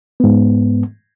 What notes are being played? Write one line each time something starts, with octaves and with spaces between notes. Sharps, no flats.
G#2 B3